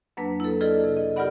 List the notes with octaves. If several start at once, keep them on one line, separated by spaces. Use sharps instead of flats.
F2 F#3 A#3 D4 B4
E4 A4
E4 F4 G#4 A4 D5 D#5
C3
D#5
F4 G4 A#4 D5 F#5 B5